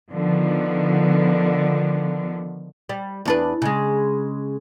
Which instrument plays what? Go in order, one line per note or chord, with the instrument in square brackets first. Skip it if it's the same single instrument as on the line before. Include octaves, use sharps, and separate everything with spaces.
[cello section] D3 D#3 F3 B3
[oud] G3
E2 D4 B4
C#3 G#3